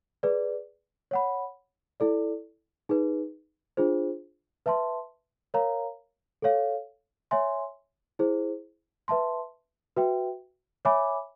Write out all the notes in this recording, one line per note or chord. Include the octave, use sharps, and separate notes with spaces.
G#4 B4 D5
C#5 F#5 B5
E4 A4 D5
D#4 G#4 B4
D4 F4 G#4 C5
B4 E5 A5 C6
A#4 C#5 F5 A#5
A4 C#5 F5
C#5 E5 G#5 C6
E4 G#4 C5
B4 E5 A5 C6
F#4 B4 E5 G5
C#5 E5 G#5 B5 D6